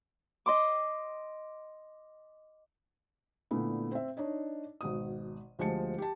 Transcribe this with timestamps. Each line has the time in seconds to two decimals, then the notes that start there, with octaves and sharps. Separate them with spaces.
0.46 D#5 C6 D6
3.51 A#2 D3 A3 B3 E4
3.92 C4 E5
4.17 D4 D#4 C#5 D#5
4.81 G#1 B2 D#6
5.59 D2 F3 G#3 G4 A5 C#7
5.98 G4 A5